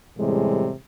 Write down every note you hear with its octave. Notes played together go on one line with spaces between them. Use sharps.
E2 A2 C3 E3 G3 G#3